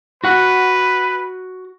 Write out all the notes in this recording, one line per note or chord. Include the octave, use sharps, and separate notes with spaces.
F#4 B4 F#5